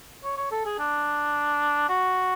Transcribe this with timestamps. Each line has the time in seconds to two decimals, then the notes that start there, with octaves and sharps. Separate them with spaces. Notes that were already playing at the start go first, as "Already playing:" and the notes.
0.24 C#5
0.37 C#5
0.52 A4
0.66 G#4
0.79 D4
1.89 F#4